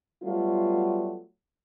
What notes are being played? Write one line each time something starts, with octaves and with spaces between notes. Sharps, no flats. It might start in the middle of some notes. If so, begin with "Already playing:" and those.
F#3 G3 A3 B3 F4